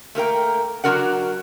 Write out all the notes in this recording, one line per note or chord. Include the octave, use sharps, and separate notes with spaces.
A3 A#3 A#4 G5
F#3 D4 F4 F#4 A#4 F#5